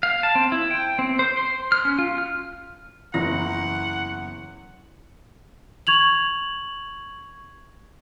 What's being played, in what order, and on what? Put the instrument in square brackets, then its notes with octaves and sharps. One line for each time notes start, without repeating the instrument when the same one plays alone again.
[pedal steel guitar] F5
A5
C4
E4
G5
C4
C5
C6
F6
C#4
F4
F6
[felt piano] F#1 E2 A#6 [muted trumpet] F#5
[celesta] C#6 G#6 F7 F#7